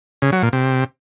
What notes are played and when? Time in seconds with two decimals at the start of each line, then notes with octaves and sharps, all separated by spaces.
0.22 C#3
0.32 F#3
0.43 A#2
0.53 C3